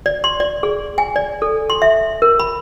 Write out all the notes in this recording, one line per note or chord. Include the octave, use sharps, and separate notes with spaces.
D5
C6
D5
G#4
G#5
D5
A4
C6
E5
A#4
B5